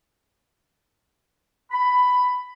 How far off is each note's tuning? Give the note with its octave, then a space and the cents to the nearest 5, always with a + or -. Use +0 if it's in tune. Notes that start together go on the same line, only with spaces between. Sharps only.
B5 +10